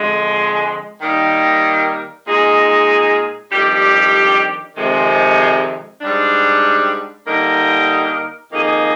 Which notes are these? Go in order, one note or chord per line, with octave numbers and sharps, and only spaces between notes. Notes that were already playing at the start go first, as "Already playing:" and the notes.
Already playing: F2 D3 G#3
D#3 G3 A#3 D#4 A#4
A#2 G#3 D#4 G#4
F2 D#3 G3 D4 G4
F2 C3 D#3 G#3
G#2 G3 D4
D3 G3 A#3 D#4 A#4
F2 D#3 A#3 D#4 G#4